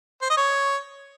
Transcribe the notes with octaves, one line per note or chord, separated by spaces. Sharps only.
C5
D#5
C#5